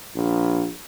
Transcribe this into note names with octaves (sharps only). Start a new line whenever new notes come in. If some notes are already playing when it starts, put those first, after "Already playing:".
A#1